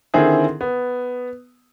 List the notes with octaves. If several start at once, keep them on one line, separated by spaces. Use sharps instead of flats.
D3 D#3 C4 E4 G#4
B3